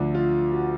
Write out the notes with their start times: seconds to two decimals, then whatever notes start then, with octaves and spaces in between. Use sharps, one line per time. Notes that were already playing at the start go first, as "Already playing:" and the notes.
Already playing: D2 D3 F3 D4
0.15 F4
0.52 F#4